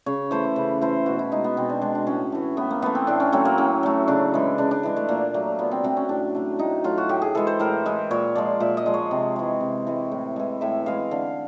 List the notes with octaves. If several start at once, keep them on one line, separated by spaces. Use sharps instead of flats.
C#3 C#5
E3 A3 C5
C#3 B4
E3 A3 C5
B2 F#4
E4
G#3 D#4
B3
B2 C4
D4
G#3 D4
D4
A2 C#4
E3 A3
A2 B3
A#3
E3 A3 B3
C4
A2 D4
C#4
F#3 A3 C4
A#3
A2 C#4
F#3 A3
C#3 D4
E3 G#3
C#3 D4
D4
E3 G#3
A3
A#2 A#3
F#3 A3
A#2 B3
C4
F#3 A3 C4
C#4
A2 D4
F#3 A3
A2 D#4
F#3 A3 F4
F#4
A2 G4
G#4
E3 G#3 A4
C5
A2 A#4
E3 G#3
A#2 C#5
F3 G#3 D5
A#2 E5
D#5
F3 G#3
C#5
C3
E3 G#3
C3
E3 G#3
A2
E3 G#3
A2 E5
E3 G#3 F5
D3 F5